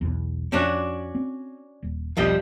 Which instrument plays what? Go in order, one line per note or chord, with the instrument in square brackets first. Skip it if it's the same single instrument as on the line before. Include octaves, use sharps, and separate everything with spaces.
[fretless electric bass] B1 E2
[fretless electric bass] F2 [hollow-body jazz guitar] C#4 D4 F#4
[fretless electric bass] C4
D#1
[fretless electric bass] E1 B1 [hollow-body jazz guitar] F3 G3 D#5